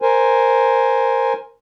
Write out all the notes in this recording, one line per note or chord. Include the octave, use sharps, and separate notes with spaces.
A#4 C5 G#5